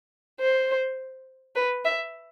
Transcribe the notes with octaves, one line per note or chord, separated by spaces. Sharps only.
C5
B4
E5